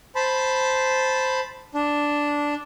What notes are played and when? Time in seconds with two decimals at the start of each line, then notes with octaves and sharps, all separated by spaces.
0.15 C5 A5 B5
1.74 D4